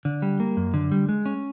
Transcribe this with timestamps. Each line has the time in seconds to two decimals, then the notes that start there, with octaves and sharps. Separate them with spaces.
0.05 D3
0.22 G3
0.40 A#3
0.57 F#2
0.74 D3
0.92 G3
1.09 G#3
1.26 C#4